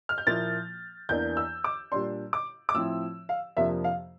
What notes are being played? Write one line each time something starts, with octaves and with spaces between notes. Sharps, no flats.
F6
G6
A#2 F3 A#3 E4 A6
E2 E3 A#3 D4 G6
E6
D6
A#2 G3 D4 C6
D6
D6
A2 F3 C4 E4 E6
F5
F2 C3 F3 A#3 D4 E5
F5